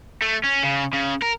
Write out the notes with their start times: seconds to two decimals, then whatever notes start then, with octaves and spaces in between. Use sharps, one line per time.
0.22 A3
0.44 C#4
0.64 C#3
0.94 C#3
1.22 A#4